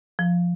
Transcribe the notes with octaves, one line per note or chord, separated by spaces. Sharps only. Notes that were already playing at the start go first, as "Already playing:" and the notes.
F3